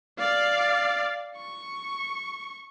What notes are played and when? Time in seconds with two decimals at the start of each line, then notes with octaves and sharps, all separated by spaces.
0.19 D5 F5
1.37 C#6